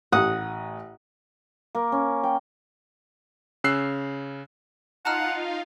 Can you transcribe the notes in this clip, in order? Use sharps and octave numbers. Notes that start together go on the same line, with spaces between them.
A1 F#5 D#6
A#3
C#4
G5
C#3 C#4 E6 F#6 C7
D#4 F4 F5 F#5 A5 A#5 F6